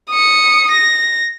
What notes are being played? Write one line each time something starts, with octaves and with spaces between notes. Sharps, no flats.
D#6 C#7
A#6